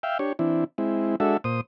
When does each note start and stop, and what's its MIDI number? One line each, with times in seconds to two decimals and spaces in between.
0.03 0.18 76
0.03 0.18 77
0.03 0.18 79
0.19 0.33 62
0.19 0.33 67
0.19 0.33 73
0.39 0.64 52
0.39 0.64 60
0.39 0.64 62
0.39 0.64 64
0.78 1.16 56
0.78 1.16 60
0.78 1.16 64
1.20 1.37 56
1.20 1.37 62
1.20 1.37 66
1.20 1.37 69
1.20 1.37 76
1.44 1.61 46
1.44 1.61 72
1.44 1.61 87